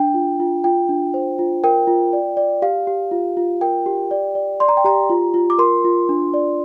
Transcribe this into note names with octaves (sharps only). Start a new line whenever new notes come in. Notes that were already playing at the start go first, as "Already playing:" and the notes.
Already playing: D4 G5
F4
F4
F4 G5
D4
C5
F4
A#4 G5
F4
D5
D5
G4 F5
G4
F4
F4
A#4 G5
G4
D5
D5
D5 C6
A#5
G5
G4 A#5
F4
F4
D6
A#4 C6
F4
D4
D5